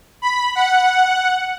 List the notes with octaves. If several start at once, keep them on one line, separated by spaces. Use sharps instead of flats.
B5
F#5